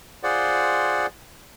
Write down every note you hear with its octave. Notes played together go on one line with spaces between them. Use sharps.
F4 G#4 C5 D5 F#5